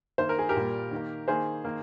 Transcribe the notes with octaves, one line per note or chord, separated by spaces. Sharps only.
D#3 A#3 C5
A#4
G#4
G4 A#4
A#2 G3 A#3
D#3 A#3
D#3 A#3 G#4 C5
D#3 A#3